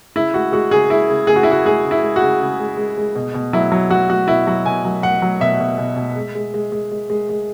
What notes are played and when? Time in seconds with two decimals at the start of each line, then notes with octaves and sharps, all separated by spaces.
0.16 C#3 E4
0.34 G#3 F#4
0.52 G#3 F#4
0.71 C#3 G#4
0.90 G#3 E4
1.09 C#3
1.27 C#3 G#4
1.36 F#4
1.43 E4
1.47 C#3 F#4
1.65 G#3 G#4
1.84 C#3
1.91 E4
2.03 G#3
2.16 F#4
2.22 C#3
2.41 C#3
2.60 G#3
2.77 G#3
2.97 G#3
3.15 B2
3.34 B2
3.53 F#3 E4
3.72 F#3
3.90 F#3 F#4
4.09 F#3 F#4
4.28 B2 E4
4.47 F#3 F#4
4.66 B2 G#5
4.85 F#3
5.03 F#3 F#5
5.22 F#3
5.40 B2 E5
5.60 B2
5.78 B2
5.97 B2
6.16 G#3
6.35 G#3
6.54 G#3
6.72 G#3
6.92 G#3
7.10 G#3
7.29 G#3